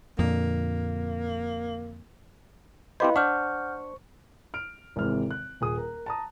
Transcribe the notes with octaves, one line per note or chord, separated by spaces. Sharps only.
F2 A#2 D3 A#3
C4 E4 G4 B4 C5 D#5 F5 B5
D4 C5 F#5 C#6 F6 G6
F6 D7
G#1 C3 E3 G#3 F6
F#6
D#1 G#4 D#6
A#4
A5 A#5 D#6